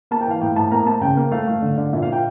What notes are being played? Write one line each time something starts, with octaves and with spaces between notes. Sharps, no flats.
A#3 A5
G5
E3 F5
A2 G5
A2 A5
A#3 A#5
A#3 A5
C#3 G5
A#3
A3 F5
A3
D3
D3
A#2 E5
F5
A#2
G5